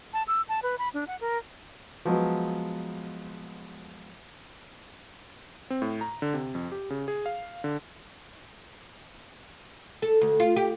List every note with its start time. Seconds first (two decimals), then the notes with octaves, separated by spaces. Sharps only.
0.13 A5
0.28 E6
0.49 A5
0.63 B4
0.79 B5
0.94 D4
1.08 F#5
1.21 A#4
2.05 F3 F#3 G#3 B3
5.70 C4
5.82 A2
6.01 A#5
6.22 D3
6.34 C3
6.55 F2
6.72 G4
6.90 C#3
7.08 G#4
7.26 F5
7.64 D3
10.02 A4
10.21 D2
10.40 F4
10.56 G4